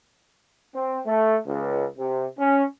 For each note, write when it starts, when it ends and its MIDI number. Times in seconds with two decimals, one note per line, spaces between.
0.75 1.00 60
1.06 1.39 57
1.46 1.85 37
1.98 2.26 48
2.39 2.64 61